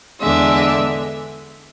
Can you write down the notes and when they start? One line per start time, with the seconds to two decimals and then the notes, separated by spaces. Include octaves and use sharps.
0.20 E2 D3 G#3 E5